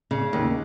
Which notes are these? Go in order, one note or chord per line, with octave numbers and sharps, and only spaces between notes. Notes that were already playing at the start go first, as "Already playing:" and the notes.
C#3
D#2